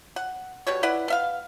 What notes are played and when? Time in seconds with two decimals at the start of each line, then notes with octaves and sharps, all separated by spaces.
0.16 F#5
0.67 B2 G3 C#5
0.83 E4 B4 D5 F#5
1.08 B3 E5 F5